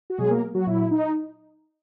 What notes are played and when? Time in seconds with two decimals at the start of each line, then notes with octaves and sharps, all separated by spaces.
0.10 F#4
0.18 B2 F#3 G#3 G#4
0.30 A#3 A#4
0.54 F#3 F#4
0.66 A#2 F#3 E4
0.91 D#4